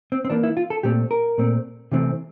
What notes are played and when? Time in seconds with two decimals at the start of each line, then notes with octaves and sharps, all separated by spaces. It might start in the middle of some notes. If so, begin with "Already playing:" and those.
0.12 C4
0.25 C4
0.30 E3 A#3 D4
0.43 E4
0.57 F4
0.70 A4
0.83 A#2 A3 C4 G4
1.11 A#4
1.38 A#2 A3 C4
1.92 C3 E3 A3 C4